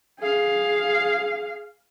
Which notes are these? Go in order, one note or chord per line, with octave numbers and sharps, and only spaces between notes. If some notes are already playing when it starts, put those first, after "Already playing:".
G#4 F5